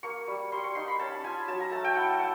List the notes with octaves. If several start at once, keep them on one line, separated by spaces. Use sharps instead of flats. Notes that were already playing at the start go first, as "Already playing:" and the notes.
A#3 C#6
G3
G3 C6
C#6
D#4 C6
B5
C#4 A5
F4 G#5
F#3 A5
A#5
A3 A5
G5
E4 F#5
F#5
A3